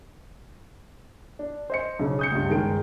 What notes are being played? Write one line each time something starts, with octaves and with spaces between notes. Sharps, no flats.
D4
C5 D#5 C#7
B1 C#3
D#6 G6 C#7
C#2 G2
G1 D#3 G#3 G#4 A#4 D7